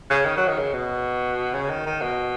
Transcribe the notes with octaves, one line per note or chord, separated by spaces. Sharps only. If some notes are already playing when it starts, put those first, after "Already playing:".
C#3
D#3
F#3
D#3
C#3
B2
C#3
D#3
D#3
B2